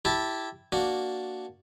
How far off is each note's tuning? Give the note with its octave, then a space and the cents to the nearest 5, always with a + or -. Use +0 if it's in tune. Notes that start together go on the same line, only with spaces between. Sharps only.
E4 +0 G4 -10 A5 +0
A#3 +0 D4 +0 F#4 +0